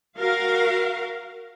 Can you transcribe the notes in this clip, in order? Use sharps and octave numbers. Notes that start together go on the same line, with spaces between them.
F#4 A#4 F5